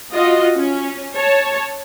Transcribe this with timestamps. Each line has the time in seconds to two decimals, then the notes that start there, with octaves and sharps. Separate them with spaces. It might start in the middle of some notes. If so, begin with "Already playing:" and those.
0.12 F4 F#4 D#5
0.55 C#4
1.15 C#5 A5